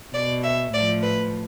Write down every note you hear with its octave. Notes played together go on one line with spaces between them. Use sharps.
B2 D5
E5
A2 F3 D5
B4